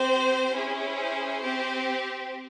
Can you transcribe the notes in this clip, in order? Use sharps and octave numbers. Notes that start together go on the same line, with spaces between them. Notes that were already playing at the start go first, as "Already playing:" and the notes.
Already playing: C4 G4 C5
C#4 E4 G#4
C5
C4 G4